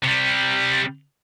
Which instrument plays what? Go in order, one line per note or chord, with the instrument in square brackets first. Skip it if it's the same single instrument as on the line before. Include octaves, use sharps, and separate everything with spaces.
[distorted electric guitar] C3 G3